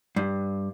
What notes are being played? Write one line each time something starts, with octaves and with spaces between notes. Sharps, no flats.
G2